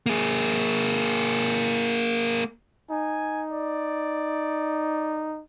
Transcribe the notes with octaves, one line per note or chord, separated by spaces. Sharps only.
A#3 G#4
D#4 G#5
D5